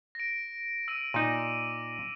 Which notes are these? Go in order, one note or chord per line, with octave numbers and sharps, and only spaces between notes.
A#6 D7
E6 D7 D#7
A#2 D#4 D6 D#7